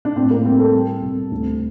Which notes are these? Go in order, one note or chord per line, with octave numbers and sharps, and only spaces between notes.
D4
A2 C4
A#3
G3 C4
A4
G3
C2
D2